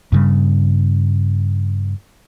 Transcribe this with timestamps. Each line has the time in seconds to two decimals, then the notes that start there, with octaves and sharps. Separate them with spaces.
0.12 G2 C#3 G3